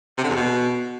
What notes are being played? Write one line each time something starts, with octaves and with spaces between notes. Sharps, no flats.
C3
D3
E2
B2